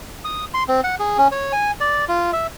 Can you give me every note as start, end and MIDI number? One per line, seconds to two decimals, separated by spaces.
0.25 0.45 87
0.54 0.63 84
0.68 0.81 60
0.84 0.95 78
0.99 1.17 68
1.17 1.28 61
1.32 1.52 73
1.53 1.71 80
1.80 2.05 74
2.08 2.31 65
2.33 2.47 76